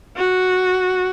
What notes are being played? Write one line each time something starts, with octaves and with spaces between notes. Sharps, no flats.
F#4